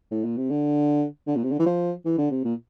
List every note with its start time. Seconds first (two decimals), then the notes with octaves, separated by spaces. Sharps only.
0.11 A2
0.25 A#2
0.37 C3
0.50 D3
1.27 D3
1.36 A#2
1.44 C3
1.51 D3
1.59 E3
1.66 F3
2.06 E3
2.18 D3
2.31 C3
2.44 A#2